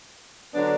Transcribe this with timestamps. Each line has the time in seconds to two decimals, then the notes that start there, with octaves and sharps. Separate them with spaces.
0.54 D3 F#3 B3 D4